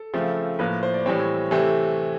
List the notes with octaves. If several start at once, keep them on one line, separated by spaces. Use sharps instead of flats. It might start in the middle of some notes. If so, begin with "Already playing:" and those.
Already playing: A4
C#3 F3 A3 C4
A2 F3 A#3 B4
C5
D5
A2 E3 G3 C4 C#5
C3 E3 A3 C4